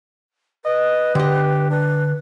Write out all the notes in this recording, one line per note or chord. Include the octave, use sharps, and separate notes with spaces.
B4 D#5
D3 G4 D#5
D4 B4